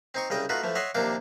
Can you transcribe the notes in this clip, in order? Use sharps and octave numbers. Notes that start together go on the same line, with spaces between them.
C4 D#4 C#6
C2 C#3 D#5 G5
A3 D#4 F4 F#4 B4
E3 F3 A3
C#5 D#5 E5 F#5 C6
D#2 C3 F3 A#3 D4 D6